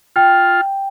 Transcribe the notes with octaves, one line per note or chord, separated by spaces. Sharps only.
F4 G5